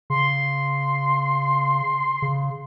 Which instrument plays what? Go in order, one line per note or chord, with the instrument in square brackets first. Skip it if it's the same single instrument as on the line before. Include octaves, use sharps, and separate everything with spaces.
[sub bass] C#3 [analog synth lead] C6
[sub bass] C#3